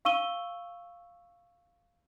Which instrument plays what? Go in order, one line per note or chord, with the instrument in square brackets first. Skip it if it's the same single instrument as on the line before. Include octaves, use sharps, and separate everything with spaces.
[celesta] F5 C#6 E6 D#7 G7